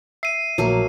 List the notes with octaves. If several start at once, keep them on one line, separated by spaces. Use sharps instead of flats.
E5 C7 D#7
A#1 F#3 A3 A#3